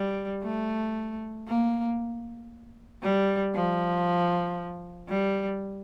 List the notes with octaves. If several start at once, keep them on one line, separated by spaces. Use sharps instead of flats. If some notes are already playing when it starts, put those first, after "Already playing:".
Already playing: G3
A3
A#3
G3
F3
G3